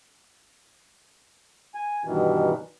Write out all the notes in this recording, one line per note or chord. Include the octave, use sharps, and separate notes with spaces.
G#5
G2 B2 D#3 E3